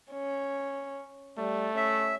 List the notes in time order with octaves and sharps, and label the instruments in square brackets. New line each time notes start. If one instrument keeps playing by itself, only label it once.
[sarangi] C#4
[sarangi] G3 [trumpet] A3
[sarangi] C#4 [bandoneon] E5